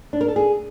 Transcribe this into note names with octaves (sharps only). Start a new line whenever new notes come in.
D4
A#4
A4
G#4